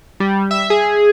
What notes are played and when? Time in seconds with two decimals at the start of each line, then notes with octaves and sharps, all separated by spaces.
0.20 G3
0.51 E5
0.70 G#4